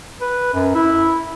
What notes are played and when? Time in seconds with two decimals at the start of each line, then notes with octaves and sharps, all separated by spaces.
0.21 B4
0.53 F#2
0.75 E4